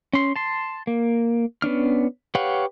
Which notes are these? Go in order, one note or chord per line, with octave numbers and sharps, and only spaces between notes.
C#4 C6
A5 C6
A#3
B3 C#4 D4 F6
G4 B4 C#5 F5 F#5